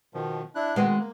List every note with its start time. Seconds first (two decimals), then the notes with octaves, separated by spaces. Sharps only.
0.14 B2 D#3 F3
0.55 D4 E4 F#6
0.76 B2 D#3 G#3 B3 C4
1.00 A#3